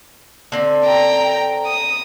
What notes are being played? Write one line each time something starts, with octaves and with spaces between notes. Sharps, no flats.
D3 C4 D5
G5 A#5
D#6